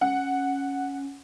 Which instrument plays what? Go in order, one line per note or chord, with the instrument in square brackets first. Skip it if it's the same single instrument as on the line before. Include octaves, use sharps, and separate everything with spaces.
[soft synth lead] C#4 [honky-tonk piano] F#5